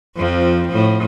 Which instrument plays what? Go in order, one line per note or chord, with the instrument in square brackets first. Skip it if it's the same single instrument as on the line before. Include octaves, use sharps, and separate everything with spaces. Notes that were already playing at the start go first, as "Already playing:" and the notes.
[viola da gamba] F2 F3 C4
A2 F3